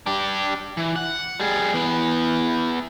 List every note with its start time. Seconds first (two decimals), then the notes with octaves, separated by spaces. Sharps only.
0.06 D4 G4
0.77 E3
0.96 F#5
1.40 G3 G#4
1.74 E3 B3